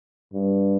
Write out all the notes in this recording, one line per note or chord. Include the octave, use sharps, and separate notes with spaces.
G2